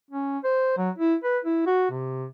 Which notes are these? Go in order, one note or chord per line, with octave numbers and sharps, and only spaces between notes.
C#4
C5
F#3
E4
B4
E4
F#4
C3